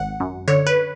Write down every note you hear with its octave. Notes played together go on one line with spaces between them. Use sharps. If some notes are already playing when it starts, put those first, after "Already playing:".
Already playing: G#1 F#5
F#2
D3 C#5
B4